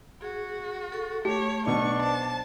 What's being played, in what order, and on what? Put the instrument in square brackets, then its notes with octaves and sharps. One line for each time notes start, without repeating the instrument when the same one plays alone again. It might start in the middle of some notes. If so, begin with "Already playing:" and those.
[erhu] F#4 [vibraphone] G#4
[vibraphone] A4 C#6
[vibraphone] A3 [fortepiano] G4 [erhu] C#5
[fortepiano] B1 B2 [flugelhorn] D4 [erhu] C#6
[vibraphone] C5 [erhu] A5